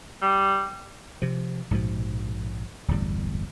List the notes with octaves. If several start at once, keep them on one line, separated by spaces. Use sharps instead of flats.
G3
C3 F3
A#1 G#2 B2 F3
D1 G1 E2 G3